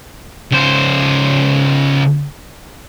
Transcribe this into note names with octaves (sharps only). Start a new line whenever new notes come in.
C#2 C5